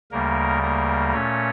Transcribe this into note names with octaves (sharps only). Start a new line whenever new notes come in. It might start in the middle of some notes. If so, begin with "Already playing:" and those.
D2 C#3 G3 A#3 A#4
A#3 A#4
A#2 A3 C#4 C#5